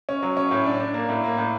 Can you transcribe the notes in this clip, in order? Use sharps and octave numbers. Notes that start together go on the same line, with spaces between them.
C#4
F#3
C#4
A2
D4
D4
A#3
A2
A#3
A2